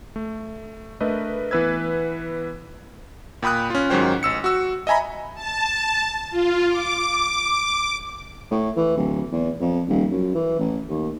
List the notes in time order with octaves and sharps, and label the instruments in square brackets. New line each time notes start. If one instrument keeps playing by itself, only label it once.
[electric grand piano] A3
A3 D4 A#4 B4 D#5 E5
E3 B3 B4 E6 G#6
A#2 G5 B5 D#6 F#6
C#4 F4
G#2 D#3 F#3 C#4 C5 G5
A1 E6 C#7
F#4 E6
D#5 E5 G#5 A#5 B5
[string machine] A5
F4
D6
[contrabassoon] A2
E3
D1
E2
F2
D#1
F#2
E3
A1
D#2